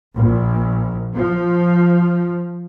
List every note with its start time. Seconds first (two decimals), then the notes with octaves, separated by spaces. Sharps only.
0.16 A#1
1.14 F3